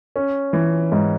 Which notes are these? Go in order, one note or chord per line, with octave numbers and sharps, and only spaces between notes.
C#4
E3
G#2